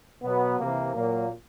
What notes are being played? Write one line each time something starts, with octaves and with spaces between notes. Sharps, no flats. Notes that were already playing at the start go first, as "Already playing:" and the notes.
B2 F#3 B3
C3 E3 A#3
A#2 F#3 A#3